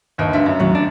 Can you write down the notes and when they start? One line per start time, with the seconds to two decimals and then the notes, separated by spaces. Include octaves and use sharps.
0.18 G1 D#2 D#4
0.33 D2 G2 E5
0.46 F#2
0.60 D#2 A2 F#3
0.75 D4